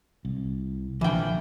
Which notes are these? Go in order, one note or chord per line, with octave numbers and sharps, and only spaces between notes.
C2
A#1 D3 E3 F3 G5